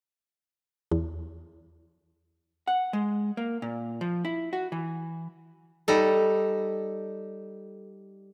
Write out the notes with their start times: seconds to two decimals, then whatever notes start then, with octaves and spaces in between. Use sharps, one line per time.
0.91 E2
2.67 F#5
2.93 G#3
3.37 A#3
3.62 A#2
4.01 F3
4.25 E4
4.53 F#4
4.72 E3
5.88 G3 D#4 A4